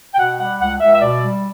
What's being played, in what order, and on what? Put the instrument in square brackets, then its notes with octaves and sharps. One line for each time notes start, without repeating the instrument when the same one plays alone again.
[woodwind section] G5
B2 F#5
G3 F#5
C#2 F#5
C#2 E5
E5
B2 D5
G3